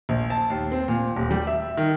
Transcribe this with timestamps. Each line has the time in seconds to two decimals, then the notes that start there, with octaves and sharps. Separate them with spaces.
0.09 A#1
0.30 A5
0.50 D#2
0.72 C4
0.88 A#2
1.16 D#1
1.31 G3
1.47 E5
1.77 D#3